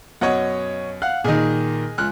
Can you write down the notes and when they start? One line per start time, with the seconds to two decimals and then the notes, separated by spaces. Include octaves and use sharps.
0.21 F#2 B2 C#5 D#5 F#5
1.02 F5 F#5 F#6
1.24 A#2 D#3 G#4 D#5
1.98 C#2 F6 F#6